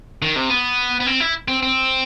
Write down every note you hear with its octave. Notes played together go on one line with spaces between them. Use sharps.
D#3
C3
B3
B3
C4
E4
C4
C4